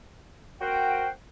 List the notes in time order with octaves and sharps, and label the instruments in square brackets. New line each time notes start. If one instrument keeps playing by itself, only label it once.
[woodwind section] C4 F#4 A#4 C5 F#5 G5